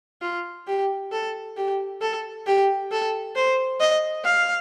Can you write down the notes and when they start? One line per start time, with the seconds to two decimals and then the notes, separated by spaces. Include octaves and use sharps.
0.22 F4
0.67 G4
1.12 A4
1.57 G4
2.01 A4
2.47 G4
2.91 A4
3.36 C5
3.80 D#5
4.25 F5